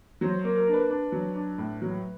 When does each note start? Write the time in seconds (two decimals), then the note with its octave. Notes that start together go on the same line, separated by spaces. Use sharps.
0.21 F#3 C5
0.39 A#3 C5
0.56 A#4
0.68 D4
0.73 B4
0.90 D4
1.12 F#3
1.35 D4
1.58 A2
1.82 F#3